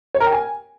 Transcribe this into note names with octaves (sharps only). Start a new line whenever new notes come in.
C#5
A#4
G5
G#5